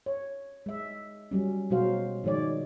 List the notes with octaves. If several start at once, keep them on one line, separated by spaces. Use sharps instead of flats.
C#5
G#3 E5
F#3 G3 C#4
B2 F#3 G#3 F#4 C5 F5
D#3 F3 G#3 C#5 D5